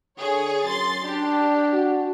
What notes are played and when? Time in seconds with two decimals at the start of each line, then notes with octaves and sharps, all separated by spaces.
0.19 D3 G#4 C#5
0.64 F#2 C6 A6
1.04 D4 G4
1.73 F#4